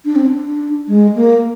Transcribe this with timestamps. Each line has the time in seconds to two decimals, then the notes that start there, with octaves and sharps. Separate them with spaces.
0.05 D4
0.16 C4
0.26 D4
0.88 G#3
1.15 A#3